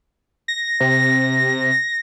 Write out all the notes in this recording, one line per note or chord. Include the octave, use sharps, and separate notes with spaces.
A#6
C3